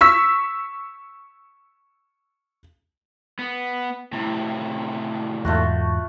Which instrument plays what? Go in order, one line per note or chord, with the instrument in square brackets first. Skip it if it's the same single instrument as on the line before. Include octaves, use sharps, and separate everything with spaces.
[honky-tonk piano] C#6 E6 B6
[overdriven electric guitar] B3
A2 C3
[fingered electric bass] E2 G#2 [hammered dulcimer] A3 F4 F#4